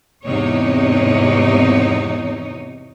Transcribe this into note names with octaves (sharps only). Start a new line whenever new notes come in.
E2 G#2 C3 D#4 C#5